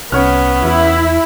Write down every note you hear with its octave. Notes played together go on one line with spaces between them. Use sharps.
C2 B3 C#4 C#5 F6
E2 E4